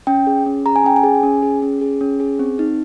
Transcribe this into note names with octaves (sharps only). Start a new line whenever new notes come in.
C#4 G5
G#4
C#4
G#4 A#5
G#5
C#4 G5
G#5
G#4
C#4
G#4
C#4
G#4
C#4
G#4
C4
D#4